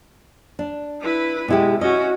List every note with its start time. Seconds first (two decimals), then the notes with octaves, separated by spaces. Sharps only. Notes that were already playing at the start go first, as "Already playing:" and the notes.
0.59 D4
1.01 E4 B4
1.48 B2 G#3 E4 G4
1.81 C#4 F#4 D#5